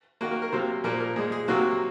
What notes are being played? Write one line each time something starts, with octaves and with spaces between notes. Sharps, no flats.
D#3 A#3 F#4
A#4
A#4
C3 F#3 A#3 C5
A#2 F3 A#3 A#4
A#4
A#2 G#3 G#4
G#4
C3 F#3 A#3 F#4